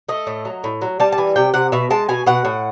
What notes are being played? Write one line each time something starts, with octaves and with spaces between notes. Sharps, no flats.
A3 D#5
A2
F#3
A2
F#3
G3 A5
A5
E3 G#5
C3 G5
C3 F#5
B2 E5
G#3 A5
B2 G#5
B2 F#5
A2